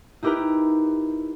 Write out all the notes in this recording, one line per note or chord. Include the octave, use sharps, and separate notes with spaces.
D#4 E4 G4 A#4 B4 A#5